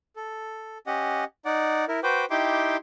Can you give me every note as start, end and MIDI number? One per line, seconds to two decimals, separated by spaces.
0.16 0.78 69
0.87 1.24 61
0.87 1.24 67
0.87 1.24 75
0.87 1.24 78
1.45 1.85 63
1.45 1.85 74
1.45 1.85 78
1.88 2.00 64
1.88 2.00 70
2.03 2.25 66
2.03 2.25 71
2.03 2.25 72
2.03 2.25 79
2.03 2.25 86
2.30 2.77 63
2.30 2.77 64
2.30 2.77 67
2.30 2.77 79
2.30 2.77 84
2.30 2.77 86